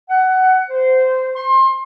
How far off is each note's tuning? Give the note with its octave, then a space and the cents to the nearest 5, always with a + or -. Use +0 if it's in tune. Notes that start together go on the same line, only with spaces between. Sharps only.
F#5 +15
C5 -15
C6 +30